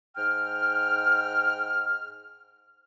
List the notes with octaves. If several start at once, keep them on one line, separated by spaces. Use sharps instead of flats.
G#2 G5 F6